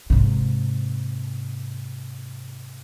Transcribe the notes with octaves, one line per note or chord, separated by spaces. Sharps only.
G#2 C3